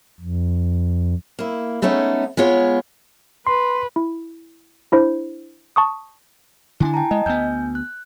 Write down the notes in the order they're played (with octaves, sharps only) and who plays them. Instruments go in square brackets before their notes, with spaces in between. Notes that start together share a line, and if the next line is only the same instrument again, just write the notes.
[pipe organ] F2
[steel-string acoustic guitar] A#3 E4
G#3 A3 B3 C#4 D#4
G#3 B3 F4 C#5
[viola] B4 [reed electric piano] C6
[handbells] E4
D4 E4 C5
A5 C#6 D#6
[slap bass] D3 C4 D4 [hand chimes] E4 G#5
[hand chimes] G5 A5 A#5
[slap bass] G#3 [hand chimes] D#5
[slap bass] D2 B3 [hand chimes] G#5 G6
[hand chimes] F#6